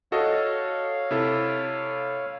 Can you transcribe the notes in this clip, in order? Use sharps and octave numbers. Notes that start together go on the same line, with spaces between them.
F#4 A4 C#5 D#5 F5
C3 E4 A4